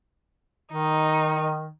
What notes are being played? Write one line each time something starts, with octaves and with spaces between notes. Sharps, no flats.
D#3 D#4